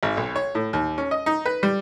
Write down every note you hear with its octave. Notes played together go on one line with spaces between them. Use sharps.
G#1
B1
C#5
A2
D#2
C#4
D#5
D#4
B4
G3